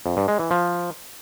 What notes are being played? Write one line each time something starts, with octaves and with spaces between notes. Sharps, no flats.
F2
G2
G#3
E3
F3